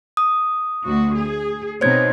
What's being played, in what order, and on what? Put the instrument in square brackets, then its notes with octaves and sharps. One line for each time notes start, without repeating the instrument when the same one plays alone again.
[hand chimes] D#6
[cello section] D2 F#4
G#4
[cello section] B2 C4 D#4 [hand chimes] C5 C#5 G#6